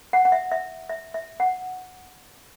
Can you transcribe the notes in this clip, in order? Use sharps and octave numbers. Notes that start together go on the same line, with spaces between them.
F#5
F#5
E5
E5
E5
E5
F#5